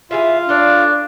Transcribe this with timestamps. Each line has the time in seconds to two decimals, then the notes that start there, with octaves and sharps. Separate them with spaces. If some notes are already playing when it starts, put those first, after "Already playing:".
0.11 E3 F4 G#4 E5 F5
0.49 D4 A4 C#5 D5